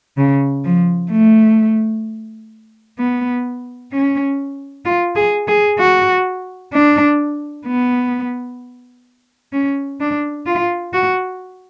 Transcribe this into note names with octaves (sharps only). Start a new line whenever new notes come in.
C#3
F3
A3
B3
C#4
F4
G#4
G#4
F#4
D4
B3
C#4
D4
F4
F#4